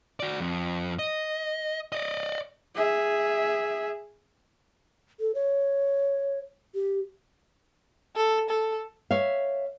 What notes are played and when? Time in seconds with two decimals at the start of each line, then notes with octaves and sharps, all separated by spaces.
0.20 F#4 D5
0.39 F2
0.99 D#5
1.92 D5 D#5
2.75 G#4 E5
5.20 A4
5.35 C#5
6.75 G4
8.16 A4
8.50 A4
9.11 C#5 E5 F5